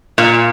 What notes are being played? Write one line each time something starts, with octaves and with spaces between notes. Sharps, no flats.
A#2